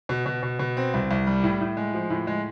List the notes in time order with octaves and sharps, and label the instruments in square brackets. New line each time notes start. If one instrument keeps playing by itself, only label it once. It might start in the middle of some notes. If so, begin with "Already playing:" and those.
[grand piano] B2
B2
B2
B2
C4
C2
C2
G3
A2
A2
G#3
F3
A2
G#3